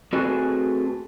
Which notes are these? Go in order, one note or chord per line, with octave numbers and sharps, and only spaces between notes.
A3 C4 F#4 G#4 B4 D5